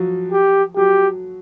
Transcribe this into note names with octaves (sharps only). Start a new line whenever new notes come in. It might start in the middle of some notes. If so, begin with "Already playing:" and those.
Already playing: F3 F#3
G4
F#3 G4